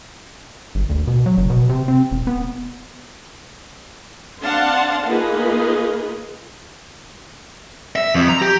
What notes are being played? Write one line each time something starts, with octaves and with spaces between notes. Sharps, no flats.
G1
D2
B2
F#3
F#1
B2
C3
C4
E1
B3
C4 D4 F5 F#5 A5 C6
A#3 D#4 F4 G#4 B4
E5
F2
A#5
G4